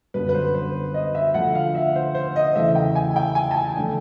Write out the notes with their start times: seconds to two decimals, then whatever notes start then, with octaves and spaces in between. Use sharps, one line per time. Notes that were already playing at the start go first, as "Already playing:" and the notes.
0.14 F#2 D3 G3 B3 B4
0.29 B4
0.34 C5
0.54 C5
0.94 D#5
1.15 E5
1.34 D3 F3 A3 F#5
1.55 F5
1.75 E5
1.96 C5
2.15 C5
2.36 D#5
2.55 E2 C#3 E3 A3 E5
2.75 G5
2.95 G#5
3.16 G5
3.35 G#5
3.51 A5
3.56 G#5
3.76 D3 F3 A3 D4 F4